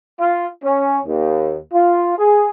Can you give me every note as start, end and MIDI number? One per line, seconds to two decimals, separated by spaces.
0.19 0.47 65
0.63 0.99 61
1.06 1.57 39
1.73 2.18 65
2.18 2.50 68